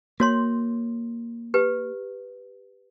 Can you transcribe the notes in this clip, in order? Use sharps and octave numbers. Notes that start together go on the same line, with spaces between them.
A#3 F#4 C#5 C6
G4 B4